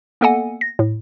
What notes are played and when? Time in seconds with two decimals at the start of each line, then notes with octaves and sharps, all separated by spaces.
0.21 A#3 B3 A4 D#5 F#5 G#5
0.61 A#6
0.79 A2